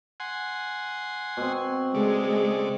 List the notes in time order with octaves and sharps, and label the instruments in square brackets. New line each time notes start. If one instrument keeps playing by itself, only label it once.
[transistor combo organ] F#5 G#5 C6
[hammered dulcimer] B2 C4
[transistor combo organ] C#3 A3 D5 [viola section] G#3